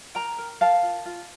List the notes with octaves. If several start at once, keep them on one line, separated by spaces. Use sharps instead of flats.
A#4 G5 A#5
A#4
A#4 F5 A5
F4
F4